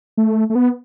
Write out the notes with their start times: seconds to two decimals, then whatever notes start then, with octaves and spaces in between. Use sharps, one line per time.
0.17 A3
0.50 A3
0.55 B3